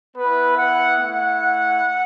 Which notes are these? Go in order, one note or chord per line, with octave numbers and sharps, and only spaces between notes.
B3 E4 B4
F#5
A3 E4 F#5